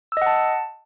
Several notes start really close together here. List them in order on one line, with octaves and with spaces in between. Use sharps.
E6 D#5 F#5 A5